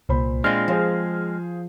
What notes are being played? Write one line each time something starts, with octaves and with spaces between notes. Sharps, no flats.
C2 A#2 C5 B5
G#3 C4 D4 F4 F6
F3 G#4 C5 F5